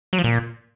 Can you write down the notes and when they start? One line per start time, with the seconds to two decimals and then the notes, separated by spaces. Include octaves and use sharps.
0.13 F#3
0.18 F3
0.24 A#2